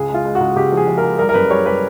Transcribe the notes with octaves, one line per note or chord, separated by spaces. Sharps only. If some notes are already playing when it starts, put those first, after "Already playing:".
Already playing: C#2 G#4
G#3
F4
G#3
F#4
C#2
C#2 G4
F3
G#4
F3
A#4
G#3
G3 A#4
A#4
F#2 B4
G3 C#5
G3 B4